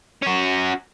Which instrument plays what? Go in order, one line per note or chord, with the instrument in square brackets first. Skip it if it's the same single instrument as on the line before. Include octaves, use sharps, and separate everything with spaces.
[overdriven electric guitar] C#4 F#4